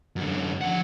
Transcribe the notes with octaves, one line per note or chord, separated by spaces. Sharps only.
F#2 D3
F3 F#5